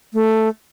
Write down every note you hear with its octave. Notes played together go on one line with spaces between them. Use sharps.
A3